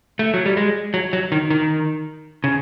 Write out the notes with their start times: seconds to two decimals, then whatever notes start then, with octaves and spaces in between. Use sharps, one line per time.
0.19 A3
0.34 F#3
0.46 G3
0.57 G#3
0.94 F#3
1.13 F#3
1.32 D#3
1.50 D#3
2.44 C#3